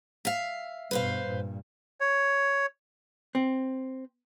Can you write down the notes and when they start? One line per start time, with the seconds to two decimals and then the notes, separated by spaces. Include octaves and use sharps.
0.25 E5 F5
0.91 G2 B2 B4 C5 F5
1.27 G2 A#2
2.01 C#5
3.35 C4